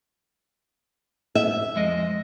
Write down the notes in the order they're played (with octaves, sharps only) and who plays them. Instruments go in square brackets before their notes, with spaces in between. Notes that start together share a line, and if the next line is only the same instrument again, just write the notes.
[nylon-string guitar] E5
[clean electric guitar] F2 G#3 D#5